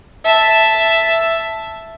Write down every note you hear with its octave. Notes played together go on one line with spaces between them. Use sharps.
E5 A5